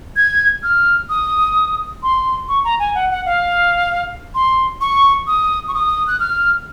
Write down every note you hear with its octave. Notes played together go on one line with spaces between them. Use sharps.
G#6
F6
D#6
C6
C#6
A#5
G#5
F#5
F#5
F5
C6
C#6
D#6
C#6
D#6
F#6
F6